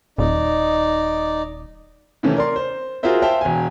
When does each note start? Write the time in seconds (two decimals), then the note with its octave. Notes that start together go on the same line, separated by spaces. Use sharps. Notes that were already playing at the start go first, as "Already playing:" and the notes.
0.18 D#1 D#4 D5
2.23 C3 D#3 E3 A3 C#4
2.36 A#4 D5 C6
2.56 C5
3.03 F4 F#4 G#4 A#4 C5 E5
3.22 C5 E5 F5 G5 A5
3.41 E1 G#5